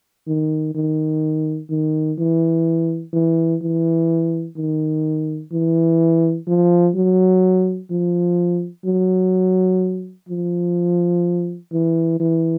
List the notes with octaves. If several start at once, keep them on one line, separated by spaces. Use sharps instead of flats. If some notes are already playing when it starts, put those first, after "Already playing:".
D#3
D#3
D#3
E3
E3
E3
D#3
E3
F3
F#3
F3
F#3
F3
E3
E3